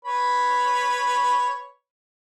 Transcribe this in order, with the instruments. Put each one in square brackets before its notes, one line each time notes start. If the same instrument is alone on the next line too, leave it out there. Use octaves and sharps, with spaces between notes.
[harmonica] B4 C#5 B5